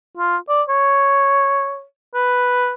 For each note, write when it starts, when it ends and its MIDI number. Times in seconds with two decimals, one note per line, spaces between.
0.17 0.37 65
0.49 0.62 74
0.69 1.84 73
2.14 2.74 71